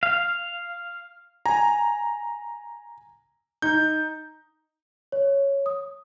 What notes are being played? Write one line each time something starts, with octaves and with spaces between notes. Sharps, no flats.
F5
G#5 A#5
D#4 G6
C#5
D#6